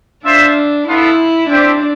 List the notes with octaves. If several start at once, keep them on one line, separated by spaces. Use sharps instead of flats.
D4 F4 C5 E5
B3 E4 F4 A4
C4 D4 G4 C5 E5 G5